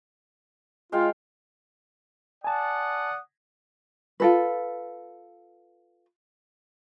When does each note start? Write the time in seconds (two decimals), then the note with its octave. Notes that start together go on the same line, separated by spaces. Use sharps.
0.92 G#3 F4 F5 G5
2.44 D5 F#5 G#5 A5 D#6
4.20 F4 A4 B4